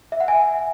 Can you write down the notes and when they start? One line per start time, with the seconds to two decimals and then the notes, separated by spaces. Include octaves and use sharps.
0.12 E5
0.20 F#5
0.28 E5 G#5